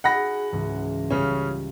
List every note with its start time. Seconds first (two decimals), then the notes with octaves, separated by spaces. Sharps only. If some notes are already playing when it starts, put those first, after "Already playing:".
0.04 D#4 F#4 G#4 F#5 B5 A#6
0.51 C#2 G#2 E3
1.10 C#3 G3 C#4 F4